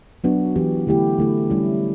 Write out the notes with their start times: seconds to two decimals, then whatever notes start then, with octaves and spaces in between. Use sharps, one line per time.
0.24 F#3 B3 D4 F#4
0.56 E3 B3 D4 G4
0.87 D3 A3 E4 G4
1.18 D3 A3 E4
1.50 G3 C#4 E4